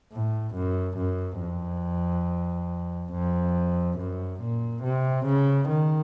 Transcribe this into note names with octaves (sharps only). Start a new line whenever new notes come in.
A2
F#2
F#2
F2
F2
F#2
A#2
C3
C#3
D#3